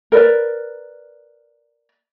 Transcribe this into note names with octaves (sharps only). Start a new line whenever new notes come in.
A#4 B4 D5